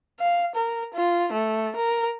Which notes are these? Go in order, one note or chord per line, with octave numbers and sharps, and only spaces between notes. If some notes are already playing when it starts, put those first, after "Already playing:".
F5
A#4
F4
A3
A#4